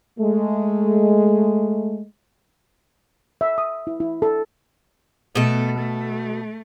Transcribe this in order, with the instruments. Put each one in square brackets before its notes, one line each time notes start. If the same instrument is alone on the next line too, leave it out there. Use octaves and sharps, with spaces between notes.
[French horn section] G#3 A3
[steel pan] E5
D#6
E4
E4
A4
[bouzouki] B2 A4 [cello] A3
[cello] A3